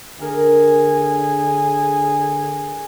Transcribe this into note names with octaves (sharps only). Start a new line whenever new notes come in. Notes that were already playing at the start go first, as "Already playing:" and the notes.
D3 G#4 A#4 A#5